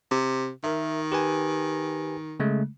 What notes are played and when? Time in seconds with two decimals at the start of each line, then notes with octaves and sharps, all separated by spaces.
0.11 C3
0.64 D#3 A#4 E5
1.12 G4 B4 G#5
2.40 C#3 G#3 A3